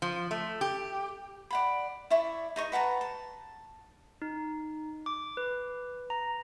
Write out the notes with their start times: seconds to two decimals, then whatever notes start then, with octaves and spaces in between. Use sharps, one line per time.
0.02 F3
0.31 A3
0.61 G4
1.51 D5 F#5 B5
2.10 E4 D5 E5 C#6
2.56 D#4 D#5 C#6
2.72 B4 F#5 A5 A#5
3.01 A5
4.22 D#4
5.06 D6
5.37 B4
6.10 A#5